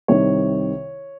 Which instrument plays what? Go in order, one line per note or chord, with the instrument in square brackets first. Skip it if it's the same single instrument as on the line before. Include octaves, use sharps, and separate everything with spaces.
[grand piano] C2 C3 D#3 C#5